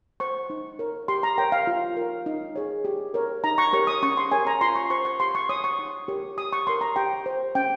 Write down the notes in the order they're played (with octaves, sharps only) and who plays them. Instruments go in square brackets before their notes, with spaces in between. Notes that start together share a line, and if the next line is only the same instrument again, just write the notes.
[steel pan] C5 C#6
D#4
A#4 C#5
G4 C6
A#5
A#4 C#5 G5
F5
F4
A#4 C#5
D#4
G#4 C#5
G4
A#4 C#5
D#4 A#5
C#6
G4 A#4 C#5 C#6
D#6
C#4 C#6
C6
G4 A#4 C#5 G#5
A#5
F4 C6
C#6
C5 C#6
C#6
G4 C6
C#6
C#5 D#6
C#6
D#4
G4 A#4 C#5
G4 D#6
C#6
A#4 C#5 C6
A#5
G4 G5
C5
C#4 G5